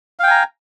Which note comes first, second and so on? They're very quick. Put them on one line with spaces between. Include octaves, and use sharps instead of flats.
F5 G5 G#5 A#5